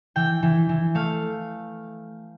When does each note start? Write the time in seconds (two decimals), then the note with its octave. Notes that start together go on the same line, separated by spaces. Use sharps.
0.16 E3 G5
0.43 E3
0.69 E3
0.95 A3 F5